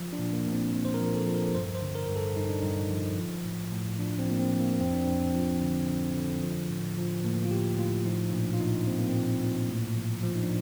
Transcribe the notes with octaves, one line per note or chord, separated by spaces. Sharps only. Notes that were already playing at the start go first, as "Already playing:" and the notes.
Already playing: F3
D4
A#2
A#3
A#2
C4
A#2
C5
A#4
F3
A4
F3
A#4
G2 C5
C5
D3
A#4
G2
A4
G2 D#4
D4
G2 D#4
F3
F3
A2
A2
F3 D4
C4
F3 A#3
C4
F3
A#3
F2 C4
D4
F2 C4
F3
D3
D3
D3
F3
A2
F3
A2 A#3
F4
A2 G4
A2 F4
F3 D#4
A#2 D4
F4
A#2 D#4
A#2 C4
A#3
A#2 C4
A#2
A2
F3
F3
D#4
D4